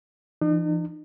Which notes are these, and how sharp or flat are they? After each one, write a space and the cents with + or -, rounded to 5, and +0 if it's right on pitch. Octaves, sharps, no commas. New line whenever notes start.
E3 +35 D#4 -45